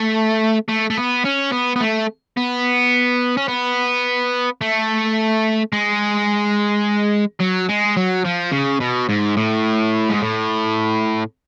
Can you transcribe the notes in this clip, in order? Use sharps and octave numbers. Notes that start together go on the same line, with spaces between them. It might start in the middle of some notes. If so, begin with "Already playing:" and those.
Already playing: A3
A3
A3
B3
C#4
B3
B3
A3
B3
C#4
B3
A3
G#3
F#3
G#3
F#3
F3
C#3
B2
G#2
A2
G#2
A2